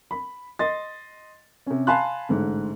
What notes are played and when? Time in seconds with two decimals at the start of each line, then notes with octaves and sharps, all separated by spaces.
0.11 B5
0.59 D#5 C6 A6
1.66 C3 C#4
1.87 F5 G#5 A5 B5 C6 F#6
2.29 A1 G#2 D3